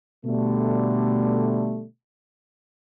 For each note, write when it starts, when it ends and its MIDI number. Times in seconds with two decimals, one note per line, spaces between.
0.25 1.83 47
0.25 1.83 50
0.25 1.83 55
0.25 1.83 57